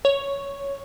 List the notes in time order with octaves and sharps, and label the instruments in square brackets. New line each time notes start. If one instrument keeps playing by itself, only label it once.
[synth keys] C#5